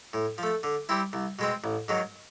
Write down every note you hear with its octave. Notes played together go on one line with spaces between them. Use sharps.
A2
F3 A3
D3
G3 C4 E4
C2
B2 G#3 C4
A1
G#2 D#3 F#3